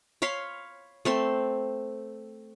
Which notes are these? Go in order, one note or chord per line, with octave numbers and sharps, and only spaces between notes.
C#5 F5 B5 C6
A3 C4 C6